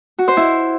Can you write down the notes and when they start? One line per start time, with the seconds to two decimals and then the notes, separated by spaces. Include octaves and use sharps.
0.19 F#4
0.28 C5
0.37 E4